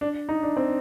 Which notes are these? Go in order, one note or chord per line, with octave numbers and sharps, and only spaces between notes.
D4
D#4
D4
C4